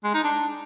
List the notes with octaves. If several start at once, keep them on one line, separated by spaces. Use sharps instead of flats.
G#3
D#4
D4